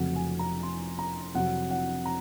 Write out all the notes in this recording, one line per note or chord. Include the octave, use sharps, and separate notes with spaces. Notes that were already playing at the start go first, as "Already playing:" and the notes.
Already playing: F1 F2 C#3 F#3 F#5
G#5
A#5
C6
A#5
F2 C3 F#3 F#5
F#5
A#5